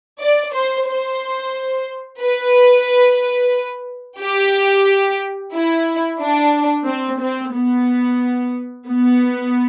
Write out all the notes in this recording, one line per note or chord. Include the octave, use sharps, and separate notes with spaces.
D5
C5
C5
B4
G4
E4
D4
C4
C4
B3
B3